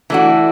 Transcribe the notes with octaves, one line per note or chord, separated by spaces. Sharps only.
E3 A3 D4 F#4